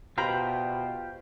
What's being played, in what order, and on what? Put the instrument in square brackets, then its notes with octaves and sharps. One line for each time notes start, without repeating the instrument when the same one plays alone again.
[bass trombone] B2 [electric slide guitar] F4 G4 C5 [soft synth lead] G5 [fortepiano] A#5 B5